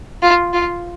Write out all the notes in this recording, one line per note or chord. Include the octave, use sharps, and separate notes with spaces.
F4
F4